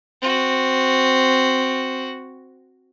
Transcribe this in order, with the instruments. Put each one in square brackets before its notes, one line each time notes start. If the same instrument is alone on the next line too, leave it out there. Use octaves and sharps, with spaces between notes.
[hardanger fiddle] C4 F#4